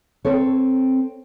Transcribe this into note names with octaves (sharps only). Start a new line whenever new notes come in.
C4 A4 C#5